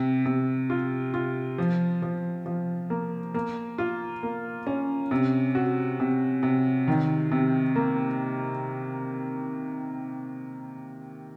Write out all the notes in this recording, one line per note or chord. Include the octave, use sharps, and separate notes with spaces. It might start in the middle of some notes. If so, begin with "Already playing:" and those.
Already playing: C3
C3
F4
F4
F3
F3
F3
A#3
A#3
F4
A#3
C#4
C3
F#4
C3
C3
D#3
C3
A#3